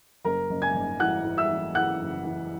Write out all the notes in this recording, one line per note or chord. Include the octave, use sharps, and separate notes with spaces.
F#1 A#4 A#5
F#1
G#5 G#6
F#1
E3 F#5 F#6
E3
E5 E6
E3
E3 F#5 F#6
F#1
E3